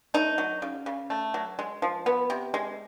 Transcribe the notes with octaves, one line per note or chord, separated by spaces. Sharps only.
A3 D#4
F#3
C#3
C#3
A3
F#3
G#3
F3
B3
C3
G#3